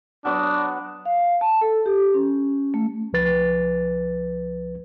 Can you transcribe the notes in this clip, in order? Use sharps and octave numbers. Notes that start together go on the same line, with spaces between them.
F#3 B3 D4 F#4
F5
A5
A4
G4
C#4
A3
C2 F3 B4 A6